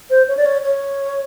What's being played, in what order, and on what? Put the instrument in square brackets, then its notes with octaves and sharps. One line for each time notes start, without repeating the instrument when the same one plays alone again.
[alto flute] C5
C#5
D5
C#5
C#5